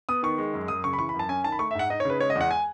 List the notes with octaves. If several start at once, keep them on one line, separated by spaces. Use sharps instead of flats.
B3 D#6
D#3 C#6
G#3
F#2
F#2 D#6
C#3 C#6
B5
E3 C#6
B5
F#2
A5
C#4 G#5
D#3 A5
B5
A3 C#6
E5
G#2 F#5
D#4 D#5
C#5
C#3 B4
G#3 C#5
D#5
E2
F#5
G#5